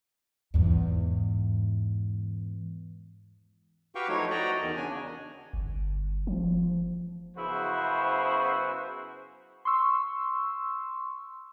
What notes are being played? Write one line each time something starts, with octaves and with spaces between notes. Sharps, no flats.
E2 G#2
F#4 G4 B4 F5 G5 C#6
F3 F#3 A3 D#4 E4 C#5
F#4 D5 D#5 G5 A#5
E2 D#3
C#3 D4 G#5
G1
F3
F#2 C#3 B3 E4 F#4 C5
C6 C#6 E6